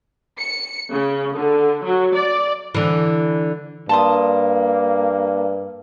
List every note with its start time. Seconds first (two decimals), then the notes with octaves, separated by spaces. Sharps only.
0.38 C#7
0.90 C#3
1.36 D3
1.84 F#3
2.15 D5
2.75 D3 E3
3.89 G2 A#3 A5 C6 D#6